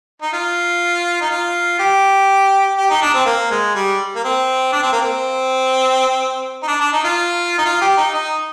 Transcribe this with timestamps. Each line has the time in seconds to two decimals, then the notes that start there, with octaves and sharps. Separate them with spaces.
0.22 D#4
0.33 F4
1.21 D#4
1.31 F4
1.79 G4
2.78 G4
2.90 D#4
3.02 D4
3.14 C4
3.26 A#3
3.51 G#3
3.75 G3
4.16 A#3
4.24 C4
4.72 D4
4.82 C4
4.93 A#3
5.02 C4
6.63 D#4
6.68 D4
6.80 D4
6.93 D#4
7.04 F4
7.58 D#4
7.65 F4
7.81 G4
7.98 D#4
8.14 D#4